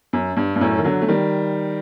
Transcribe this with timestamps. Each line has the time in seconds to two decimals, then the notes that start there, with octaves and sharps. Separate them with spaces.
0.13 F#2
0.37 G2
0.56 G2
0.61 F#2 A2
0.78 D#3
0.84 D3 F#3
1.02 A3
1.08 D#3 G3